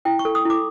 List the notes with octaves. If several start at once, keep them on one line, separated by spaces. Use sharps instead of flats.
E4 G5
C#6
A4
D#6
E4 D6